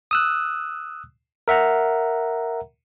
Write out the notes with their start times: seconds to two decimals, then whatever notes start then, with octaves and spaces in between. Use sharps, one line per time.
0.11 D#6 E6 F#6
1.48 A#4 E5 F#5 A#5